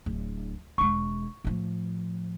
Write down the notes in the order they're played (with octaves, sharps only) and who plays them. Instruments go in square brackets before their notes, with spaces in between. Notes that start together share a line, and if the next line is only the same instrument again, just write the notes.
[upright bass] D1
[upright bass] E1 G#3 [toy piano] C#6
[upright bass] A2 F3